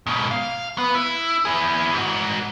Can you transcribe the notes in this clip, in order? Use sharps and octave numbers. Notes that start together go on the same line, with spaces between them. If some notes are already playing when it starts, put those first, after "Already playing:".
G#2 B2
F5
B3
E4
E4 G#4
G#2 F#4